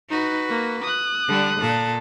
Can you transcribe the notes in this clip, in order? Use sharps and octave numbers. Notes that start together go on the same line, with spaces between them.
D#4 F#4 B4
A#3
D#6 F#6
D3 G3
A#2 A4